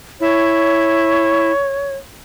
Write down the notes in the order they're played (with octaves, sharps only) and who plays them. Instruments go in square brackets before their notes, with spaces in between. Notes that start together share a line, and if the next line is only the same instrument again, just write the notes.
[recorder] E4 [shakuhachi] C#5